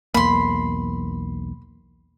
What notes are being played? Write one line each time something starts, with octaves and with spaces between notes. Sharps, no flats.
B1 E2 A#3 B5 C6